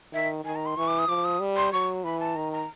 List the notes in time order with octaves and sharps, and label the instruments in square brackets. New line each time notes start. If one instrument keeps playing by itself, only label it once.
[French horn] D#3 [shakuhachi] E5
[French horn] D#3 [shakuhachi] G#5
[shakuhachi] A#5
C6
[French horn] E3 [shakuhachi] C#6
[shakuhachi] D6
D#6
[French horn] F3 [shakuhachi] D6
[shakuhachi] D#6
[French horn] G3
[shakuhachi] C6
[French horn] F#3 [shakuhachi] C#6
[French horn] E3 [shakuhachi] B5
[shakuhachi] A5
[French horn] D#3 [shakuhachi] A#5
[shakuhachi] A#5